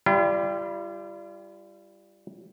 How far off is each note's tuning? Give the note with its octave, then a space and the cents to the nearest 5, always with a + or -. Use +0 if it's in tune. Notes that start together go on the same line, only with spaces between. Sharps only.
G3 +0 F4 -45